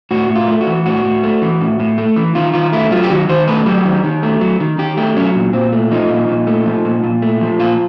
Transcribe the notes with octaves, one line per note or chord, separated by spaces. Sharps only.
A2 F#4
A2
F4
A3
F#4
E3
A2 F#4
A2
A3
E3
A2
A2
A3
E3
D#3 F4
D#3 F4
A3 E4
F#3 F4
G4
D#3 F#4
D#3 C5
A3 B4
F#3 G4
D#3
D#3
A3
F#3
D#3
D#3 G4
A3 G4
F#3 C#4
A#2
A#2 C4
A3
F3 D#4
A#2
A#2
A3
F3
A#2
A#2
A3
F3
A#2 F4